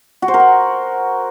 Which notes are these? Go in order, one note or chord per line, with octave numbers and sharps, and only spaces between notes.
F#4
C5
A#4
F#5